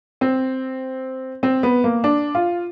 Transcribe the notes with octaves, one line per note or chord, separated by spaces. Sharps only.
C4
C4
B3
A#3
D4
F4